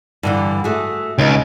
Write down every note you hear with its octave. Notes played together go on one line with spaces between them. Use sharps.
G2 D3 E3
A3 F#4 G#4
C#2 C#4 D#4